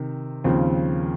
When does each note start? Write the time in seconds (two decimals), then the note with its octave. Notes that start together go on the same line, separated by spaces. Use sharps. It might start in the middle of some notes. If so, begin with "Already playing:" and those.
Already playing: C3 D#3
0.44 D#2 C#3 F3 C4